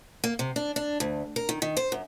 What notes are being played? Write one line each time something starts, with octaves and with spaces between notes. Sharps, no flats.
A#3
C3
D4
D4
D2
A#4
D#3
D#3
C5
F#2